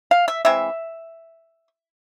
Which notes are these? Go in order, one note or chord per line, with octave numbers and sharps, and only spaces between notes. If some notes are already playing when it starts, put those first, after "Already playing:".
F5
E5
E3 G#3 C4 E5